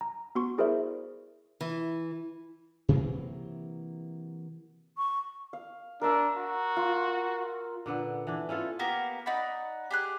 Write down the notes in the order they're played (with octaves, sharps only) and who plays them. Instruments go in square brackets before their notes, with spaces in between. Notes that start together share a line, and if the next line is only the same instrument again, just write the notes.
[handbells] A#5
B3 F#4 C6 C#6
E4 G#4 A#4 C5 D5 E5
[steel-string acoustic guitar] E3
[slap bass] C3 E3 F#3 A#3
[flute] C#6
[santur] F5
[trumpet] D4 [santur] A#4 E5
[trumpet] F#4
[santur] F4
[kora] A#2 D3 B3
E3 D4
C#4 E4 F4 A4
[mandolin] A#3 B3 G4 A#4
D#4 D5 F#5 B5
G4 G#4 F#6